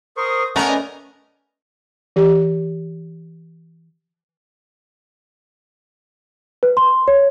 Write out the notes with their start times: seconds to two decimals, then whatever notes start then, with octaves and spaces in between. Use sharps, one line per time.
0.17 A#4 C5 C#6 D#6
0.56 A3 B3 C#4 A#4 F#5 G#5 C#6
0.68 B4 D5 D#5
2.16 E3 G4
6.63 B4
6.77 C6
7.08 C#5